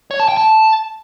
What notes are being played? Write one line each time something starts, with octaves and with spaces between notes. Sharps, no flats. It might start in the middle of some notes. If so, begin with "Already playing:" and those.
C#5
A5
G5
A5